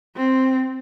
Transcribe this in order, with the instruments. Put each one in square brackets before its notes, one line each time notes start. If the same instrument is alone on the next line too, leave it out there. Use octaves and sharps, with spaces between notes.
[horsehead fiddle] C4